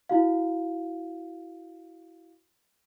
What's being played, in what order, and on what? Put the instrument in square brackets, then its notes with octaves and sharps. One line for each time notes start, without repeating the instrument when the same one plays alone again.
[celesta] E4 F#4 F5